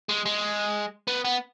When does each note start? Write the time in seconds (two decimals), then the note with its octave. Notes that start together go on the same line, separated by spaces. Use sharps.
0.09 G#3
0.26 G#3
1.07 B3
1.25 B3